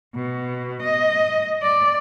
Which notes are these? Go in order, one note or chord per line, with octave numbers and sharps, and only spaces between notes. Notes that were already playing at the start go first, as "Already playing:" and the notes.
B2
D#5
D5